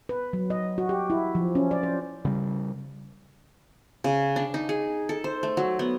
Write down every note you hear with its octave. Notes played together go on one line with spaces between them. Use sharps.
B4
F#3
D#5
F#4
G4
E4
F3
C#4
D5
C5
C#3 G3
C#3
D4
D#4
G#4
A4
C5
A3
F#3
B3